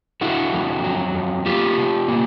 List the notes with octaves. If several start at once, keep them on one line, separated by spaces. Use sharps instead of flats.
D3 E4 F#4
F2
F#3
F2
A#3 F4 G4
C3
A#3